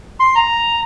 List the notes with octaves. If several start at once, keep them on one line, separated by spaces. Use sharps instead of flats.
C6
A#5